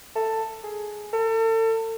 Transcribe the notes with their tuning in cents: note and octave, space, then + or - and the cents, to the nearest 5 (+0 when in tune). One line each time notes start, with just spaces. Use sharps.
A4 +15
G#4 +10
A4 +35